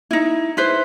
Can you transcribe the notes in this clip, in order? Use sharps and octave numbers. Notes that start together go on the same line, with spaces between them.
D#4 E4
E4 B4 C5